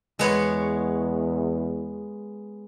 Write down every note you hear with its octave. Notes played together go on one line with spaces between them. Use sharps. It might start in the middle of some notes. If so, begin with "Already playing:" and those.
E2 G#3 B3 C#5